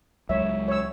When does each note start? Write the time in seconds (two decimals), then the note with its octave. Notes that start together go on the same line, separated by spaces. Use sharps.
0.29 C#2 F#3 G#3 C#5 E5
0.68 C#5 E6